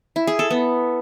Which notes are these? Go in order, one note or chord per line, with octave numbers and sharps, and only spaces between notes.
E4
G#4
A4
B3